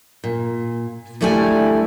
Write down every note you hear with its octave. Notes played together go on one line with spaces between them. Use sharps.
A#2
D2 G3 A3 E4 G4 G#5